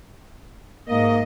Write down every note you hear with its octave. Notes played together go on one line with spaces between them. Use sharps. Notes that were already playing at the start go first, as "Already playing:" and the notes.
G#2 A#3 D#5